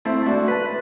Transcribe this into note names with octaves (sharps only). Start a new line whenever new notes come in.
A3 C4 E4
A3 D4 F#4
B4